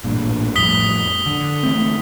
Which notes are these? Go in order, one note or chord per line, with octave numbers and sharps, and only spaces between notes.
A1 G2 A#2
F2 A2 D#6 B6 G7
D3
E3 A3 C4